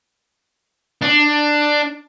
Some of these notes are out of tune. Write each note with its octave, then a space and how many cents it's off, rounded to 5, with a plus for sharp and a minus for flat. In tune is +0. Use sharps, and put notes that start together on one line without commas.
D4 +10